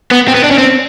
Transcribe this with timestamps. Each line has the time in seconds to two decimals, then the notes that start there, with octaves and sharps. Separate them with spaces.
0.12 B3
0.28 C4
0.35 B3
0.44 D4
0.51 C#4
0.58 C4